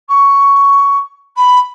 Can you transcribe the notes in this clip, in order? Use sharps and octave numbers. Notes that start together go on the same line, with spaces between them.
C#6
B5